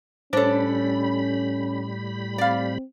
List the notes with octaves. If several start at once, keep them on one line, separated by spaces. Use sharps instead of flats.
A2 G3 C#4 D4 A4 C5 C#5 B5
C4 D5 F5